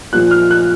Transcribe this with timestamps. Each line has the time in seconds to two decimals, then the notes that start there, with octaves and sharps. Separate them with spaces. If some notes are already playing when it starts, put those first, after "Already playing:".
0.12 A#2 F3 F#6
0.31 F6
0.51 F#6